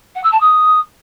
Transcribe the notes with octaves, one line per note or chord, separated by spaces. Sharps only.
F#5
E6
A5
D#6